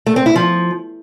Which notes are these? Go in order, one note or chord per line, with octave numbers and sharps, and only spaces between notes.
A3
C4
E4
F3